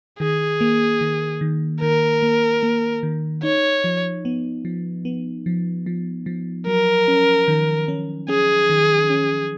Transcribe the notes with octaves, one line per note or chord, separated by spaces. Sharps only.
D#3 G#4
A#3
D#3
D#3
D#3 A#4
A#3
A#3
D#3
D#4 C#5
F3
B3
F3
B3
F3
F3
F3
F#3 A#4
C#4
D#3
C#4
C#4 G#4
D#3
C#4